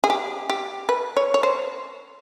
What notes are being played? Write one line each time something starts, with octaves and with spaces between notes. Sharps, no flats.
G#4
G4
G4
B4
C#5
C#5
C5